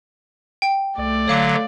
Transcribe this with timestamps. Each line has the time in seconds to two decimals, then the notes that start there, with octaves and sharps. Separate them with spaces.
0.62 G5
0.98 C2 A3 D5
1.28 D1 D3 F#3 C#5 F5 D6